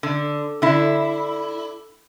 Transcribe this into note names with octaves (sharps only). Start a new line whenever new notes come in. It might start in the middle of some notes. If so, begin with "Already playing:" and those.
D3
D3 E4